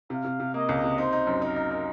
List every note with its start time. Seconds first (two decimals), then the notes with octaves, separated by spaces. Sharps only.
0.10 C3 F5
0.24 C3
0.40 C3
0.54 A#3 D#5
0.69 C#2
0.84 C3
0.98 D#4 C5
1.13 D#4
1.27 F#2
1.41 D#4 A#4
1.56 D#4
1.71 D#4